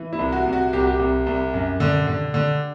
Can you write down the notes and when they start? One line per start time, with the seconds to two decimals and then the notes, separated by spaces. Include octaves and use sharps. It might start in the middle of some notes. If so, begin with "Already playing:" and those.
Already playing: E3
0.13 E4
0.19 C2
0.32 F#4
0.46 C2
0.53 F#4
0.73 C2 G4
0.80 F#4
0.87 G4
1.00 C2
1.27 C2
1.54 F#2
1.80 D3
2.07 D3
2.34 D3